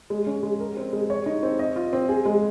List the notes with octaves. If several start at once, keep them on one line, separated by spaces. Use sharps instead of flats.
G#3
C#4
G#3
A#4
C4
G#3
C#5
D#4
C4
D#5
F4
C4
G#4
G#3